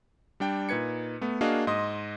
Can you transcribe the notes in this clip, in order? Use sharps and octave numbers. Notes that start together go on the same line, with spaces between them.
G3 D4 G5
A#2 D#4 B4 G#6 C#7
A3 B3
A#3 D4 F#4 G#4 D#5 F5
G#2 D#5 C6 D#6 A#6